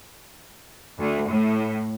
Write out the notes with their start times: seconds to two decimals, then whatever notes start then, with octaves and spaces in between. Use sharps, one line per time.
0.99 D2
1.29 A2